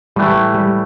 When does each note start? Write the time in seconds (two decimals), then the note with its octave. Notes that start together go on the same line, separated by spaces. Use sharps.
0.16 A2 E3 G3 A3
0.54 G3